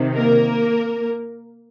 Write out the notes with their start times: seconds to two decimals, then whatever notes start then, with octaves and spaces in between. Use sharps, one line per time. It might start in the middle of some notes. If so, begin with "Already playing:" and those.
Already playing: C3 D#3
0.16 A#3 A#4